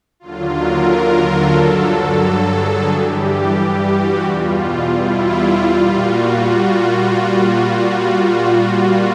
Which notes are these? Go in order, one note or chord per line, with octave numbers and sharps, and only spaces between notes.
D#2 D3 F#3 F4
A#4
A4
G2 D3 F#3
A4
G#4
G2 E3 G3 G4
F#4
E2 B2 G3 F4
E4
F4
A#2 G3
F#4
F#4